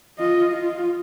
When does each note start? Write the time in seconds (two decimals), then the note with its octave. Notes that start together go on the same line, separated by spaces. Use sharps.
0.19 F4 D#5
0.52 F4